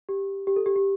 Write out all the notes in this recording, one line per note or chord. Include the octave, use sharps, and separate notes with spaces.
G4
G4
A4
G4
G4